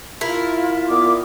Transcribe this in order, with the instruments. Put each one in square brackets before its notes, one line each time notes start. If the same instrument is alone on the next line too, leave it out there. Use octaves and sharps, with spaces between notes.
[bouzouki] E4 A#4 [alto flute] F4
[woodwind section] A#2 B3 D6